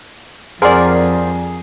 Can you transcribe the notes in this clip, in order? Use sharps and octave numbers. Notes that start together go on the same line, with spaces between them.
F2 G#4 A#4 C5 D5 F#5 C6